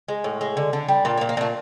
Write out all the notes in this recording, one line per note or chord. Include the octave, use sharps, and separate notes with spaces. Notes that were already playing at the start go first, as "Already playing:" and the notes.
G#3
A2
G#3
D3
D3
G3
A#2 A#3
A#3
A#2
A#3
A#2 A3